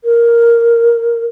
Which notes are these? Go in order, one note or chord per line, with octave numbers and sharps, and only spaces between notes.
A#4